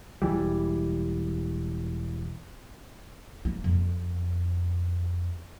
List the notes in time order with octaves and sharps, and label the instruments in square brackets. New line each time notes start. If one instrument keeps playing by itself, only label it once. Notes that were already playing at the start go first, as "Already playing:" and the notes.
[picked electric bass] E1 C#2 E3 G3
[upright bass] A#3
F2